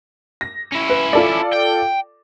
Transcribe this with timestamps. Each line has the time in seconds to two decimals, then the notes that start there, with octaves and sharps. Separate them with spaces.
0.41 A#6
0.72 C#4 E4
0.90 B4
1.13 F4 A4 D5
1.53 G5